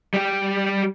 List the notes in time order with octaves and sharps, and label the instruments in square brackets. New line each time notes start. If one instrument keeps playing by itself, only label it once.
[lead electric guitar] G3 G4